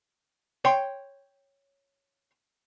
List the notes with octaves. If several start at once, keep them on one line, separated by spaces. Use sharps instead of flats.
C#5 G5 C6